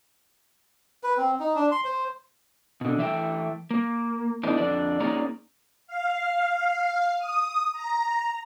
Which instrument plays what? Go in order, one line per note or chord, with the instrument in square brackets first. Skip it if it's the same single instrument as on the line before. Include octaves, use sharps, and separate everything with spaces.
[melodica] B4
C4
D#4
D4
C6
C5
[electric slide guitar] B2 D3
E3 A3 E5 F5 G5
A#3
E3 A3 B3 D4 D#4
F2 D3 D4 D5
A#3 C#4 D#4 G#4 D5 A#5
[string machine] F5
D#6
A#5